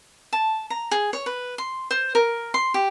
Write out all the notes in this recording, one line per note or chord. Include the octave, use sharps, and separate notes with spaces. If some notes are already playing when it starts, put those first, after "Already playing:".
A5
A#5
G#4
C#5
B4
C6
C5
A#4
C6
G4